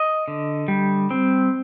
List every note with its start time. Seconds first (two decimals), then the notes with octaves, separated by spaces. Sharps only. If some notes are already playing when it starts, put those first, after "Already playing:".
Already playing: D#5
0.28 D3
0.68 G3
1.11 C4